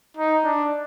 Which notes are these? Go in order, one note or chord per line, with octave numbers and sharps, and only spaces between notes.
D#4
D4